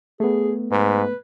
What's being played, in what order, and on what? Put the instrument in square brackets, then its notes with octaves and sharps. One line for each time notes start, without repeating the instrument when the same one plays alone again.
[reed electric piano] A3 B3 [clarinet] G#4
[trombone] G#2 [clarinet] B4